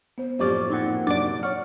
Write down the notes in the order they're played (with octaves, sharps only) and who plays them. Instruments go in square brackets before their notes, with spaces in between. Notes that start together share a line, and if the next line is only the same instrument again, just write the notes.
[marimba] B3 C5
[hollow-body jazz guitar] F#2 A2 F3 [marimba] A#3 G4 C5 [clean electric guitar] C#4 D5
[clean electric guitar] A#2 C4 F#5 [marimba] D#4
[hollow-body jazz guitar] F#2 C3 [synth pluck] D4 D5
[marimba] C#5 C#6 F6 [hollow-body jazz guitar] F#5